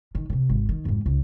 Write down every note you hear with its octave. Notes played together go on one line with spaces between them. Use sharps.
D#3
C3 D#3
G#1
D#3
F2 G#2
C#2